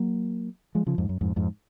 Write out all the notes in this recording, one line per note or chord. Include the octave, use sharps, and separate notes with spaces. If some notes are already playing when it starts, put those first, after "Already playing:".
Already playing: F#3 A#3
F3 G#3
C#3 F3
F2 G#2
F#2
F2 G#2
F2 G#2